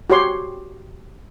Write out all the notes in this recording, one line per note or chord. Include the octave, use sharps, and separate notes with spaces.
F#4 G4 C#5 C6